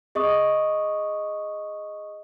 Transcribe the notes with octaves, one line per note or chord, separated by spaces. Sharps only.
G#4 D#5 C#6 D#6